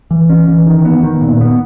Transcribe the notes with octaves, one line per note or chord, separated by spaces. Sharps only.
E3
C#4
E3
D#3
B3
D#3
A#2
B3